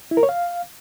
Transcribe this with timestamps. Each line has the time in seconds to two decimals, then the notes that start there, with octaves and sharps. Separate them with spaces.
0.11 E4
0.17 A#4
0.23 C#5
0.29 F5